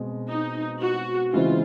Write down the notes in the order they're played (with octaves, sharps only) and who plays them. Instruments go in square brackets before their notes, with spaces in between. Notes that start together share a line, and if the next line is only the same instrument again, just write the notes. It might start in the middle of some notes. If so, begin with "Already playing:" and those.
Already playing: [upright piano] B2 G#3 C4
[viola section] D#4
F#4
[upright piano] C#3 E3 G#3 C4 [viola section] F4